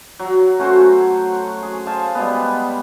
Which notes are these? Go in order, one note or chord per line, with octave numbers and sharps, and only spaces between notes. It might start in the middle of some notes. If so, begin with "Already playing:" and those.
F#3
A3 C#4 F#4 C5
G#4
C5 F5 G#5 A5
G3 G#3 B3